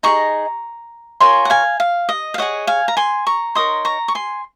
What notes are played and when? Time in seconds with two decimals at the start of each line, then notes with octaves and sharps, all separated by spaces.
0.03 D#4 G#4 D#5 A#5 C#6
1.21 F4 A#4 C#5 G#5 C6
1.45 F#5
1.50 F5 G#5
1.80 F5
2.09 D#5
2.34 F5
2.38 G#4 C#5 D#5 F#5
2.67 F5 G#5
2.88 A#5
2.97 G#5 C6
3.27 A#5 C#6
3.55 D#4 A#4 C#5 C6 D#6
3.85 A#5 C#6
4.08 C#6
4.15 G#5 C6